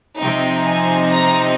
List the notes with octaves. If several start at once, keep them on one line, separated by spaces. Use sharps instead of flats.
C3 F3 C4 D#4 G5
G#5
A#5